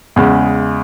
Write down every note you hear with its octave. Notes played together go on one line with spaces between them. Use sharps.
E2 C#3 G#3